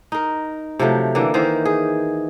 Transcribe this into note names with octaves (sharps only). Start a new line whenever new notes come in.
D#4 A#4
C3 F3 F#3 A3
D3 E3 A#3
D#3 E3 C5 E5
G#4